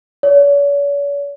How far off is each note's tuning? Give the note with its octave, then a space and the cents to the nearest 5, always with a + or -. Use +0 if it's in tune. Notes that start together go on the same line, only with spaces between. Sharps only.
C#5 +45